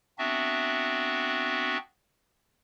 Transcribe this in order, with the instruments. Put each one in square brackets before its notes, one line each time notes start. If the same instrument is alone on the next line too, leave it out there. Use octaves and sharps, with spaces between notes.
[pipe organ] B3 C4 D4 F#4 E5